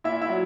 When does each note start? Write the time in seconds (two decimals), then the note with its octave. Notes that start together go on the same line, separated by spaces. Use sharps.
0.04 A#2 E4 E5
0.21 E4 E5
0.29 F#3